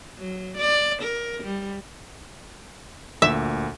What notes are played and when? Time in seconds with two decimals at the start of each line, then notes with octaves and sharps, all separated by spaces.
0.18 F#3
0.57 D5
1.02 A#4
1.43 G3
3.22 D2 A#2 E5